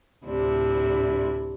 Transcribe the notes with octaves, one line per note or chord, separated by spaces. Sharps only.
D2 A2 C3 D4 E4